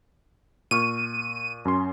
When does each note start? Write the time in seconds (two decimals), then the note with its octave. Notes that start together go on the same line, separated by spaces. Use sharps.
0.71 A#2 C#6 F6 D#7
1.65 F#2 C#4 C6